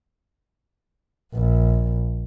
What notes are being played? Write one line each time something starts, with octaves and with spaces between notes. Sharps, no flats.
A#1